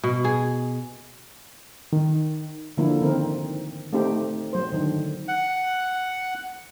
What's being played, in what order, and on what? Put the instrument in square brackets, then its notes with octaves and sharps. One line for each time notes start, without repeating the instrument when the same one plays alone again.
[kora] B2
G#4
[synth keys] D#3
[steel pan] D3 F3 A#3 E4
D#3 C4 A#4
A3 C4 D#4 G4
F#3 C5
D3 D#3
[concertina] F#5